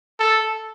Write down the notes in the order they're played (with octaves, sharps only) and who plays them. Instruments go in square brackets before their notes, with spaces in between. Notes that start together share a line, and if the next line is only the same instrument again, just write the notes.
[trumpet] A4